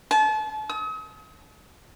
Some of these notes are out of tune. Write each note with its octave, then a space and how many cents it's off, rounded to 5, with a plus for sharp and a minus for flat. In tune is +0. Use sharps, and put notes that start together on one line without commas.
A5 -35
D#6 +40